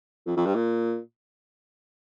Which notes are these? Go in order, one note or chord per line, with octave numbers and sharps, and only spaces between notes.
F2
F2
G2
A#2